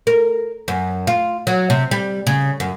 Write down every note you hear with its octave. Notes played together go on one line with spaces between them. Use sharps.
A#4
F#2
F4
F#3
C3
G3
C#3
F#2